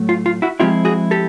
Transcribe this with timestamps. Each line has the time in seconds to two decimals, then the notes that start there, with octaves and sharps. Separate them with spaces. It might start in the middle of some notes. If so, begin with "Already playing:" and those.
Already playing: A2 F#3 A3
0.09 F4
0.26 F4
0.42 E4 F#4
0.60 F3 G#3 C4 E4 F4 G4
0.85 F#4 G#4
1.11 G4 A4